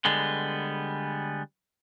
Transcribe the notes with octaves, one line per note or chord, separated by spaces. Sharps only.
D3 G3 G#3 B3